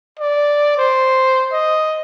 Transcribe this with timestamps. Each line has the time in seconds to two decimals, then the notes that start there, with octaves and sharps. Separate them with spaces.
0.19 D5
0.78 C5
1.52 D#5